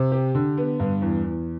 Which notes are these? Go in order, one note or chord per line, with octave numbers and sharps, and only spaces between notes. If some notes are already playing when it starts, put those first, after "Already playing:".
Already playing: C3
G4
D3
B3
G2
E2
E2